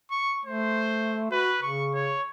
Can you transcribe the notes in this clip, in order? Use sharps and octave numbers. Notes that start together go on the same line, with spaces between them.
C#6
A3 C5
F#4 B4
C#3 C#6
C#5